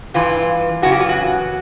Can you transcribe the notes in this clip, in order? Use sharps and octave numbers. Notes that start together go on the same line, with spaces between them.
G2 E3 F4
F#2 C#3 E3 F#4
G4
F4
F#4